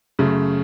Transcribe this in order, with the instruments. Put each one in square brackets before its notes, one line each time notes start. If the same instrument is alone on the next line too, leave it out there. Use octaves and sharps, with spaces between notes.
[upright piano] F#2 C#3 A3